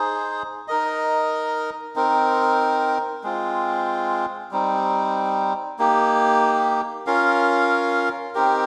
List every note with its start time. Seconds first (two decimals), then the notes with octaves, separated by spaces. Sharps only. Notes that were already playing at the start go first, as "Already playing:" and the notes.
Already playing: D#4 G#4 C5
0.68 D#4 A#4 D#5
1.96 C4 D#4 A#4
3.24 G#3 C4 F4
4.51 G3 C4 D#4
5.79 A#3 D#4 G4
7.07 C#4 F4 A#4 F5
8.35 C4 D#4 G4 A#4